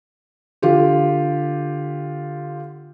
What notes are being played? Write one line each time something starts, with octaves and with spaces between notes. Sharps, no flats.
D3 F4 G4